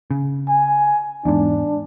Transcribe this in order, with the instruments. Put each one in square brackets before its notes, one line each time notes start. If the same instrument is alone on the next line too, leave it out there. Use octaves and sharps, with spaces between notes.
[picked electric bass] C#3
[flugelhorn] G#5
[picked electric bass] E2 G#2 [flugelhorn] D4